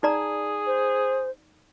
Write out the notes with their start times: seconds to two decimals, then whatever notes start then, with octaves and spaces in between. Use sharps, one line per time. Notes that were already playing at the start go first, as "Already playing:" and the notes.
0.03 D#4 G#4 D5 A#5
0.66 C5